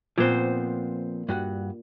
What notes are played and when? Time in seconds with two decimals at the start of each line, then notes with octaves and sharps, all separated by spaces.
0.18 A#2 F3 B3 C4 C5
1.29 G2 F#4 F#5